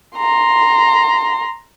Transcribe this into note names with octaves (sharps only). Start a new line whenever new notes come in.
A#5 C6